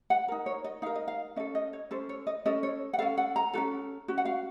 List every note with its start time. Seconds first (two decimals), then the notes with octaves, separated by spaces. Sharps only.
0.10 F#5
0.28 D#4 A#4
0.46 C#5
0.64 D#5
0.82 D#4 A#4 F5
0.95 D#5
1.08 F5
1.36 C#4 A4 D#5
1.55 D#5
1.73 C#5
1.91 C#4 A4 C5
2.09 C#5
2.27 D#5
2.46 C#4 A4 D#5
2.63 C#5
2.93 F#5
2.99 C#4 A4 F5
3.18 F#5
3.36 A#5
3.53 C#4 F#4 A4
4.08 C#4 F#4
4.18 F#5
4.25 F5